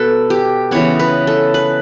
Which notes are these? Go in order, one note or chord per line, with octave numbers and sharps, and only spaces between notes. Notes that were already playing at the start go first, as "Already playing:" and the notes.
Already playing: B2 A4 B4
G4
C#3 E3 B3 C#5
B4
A4
B4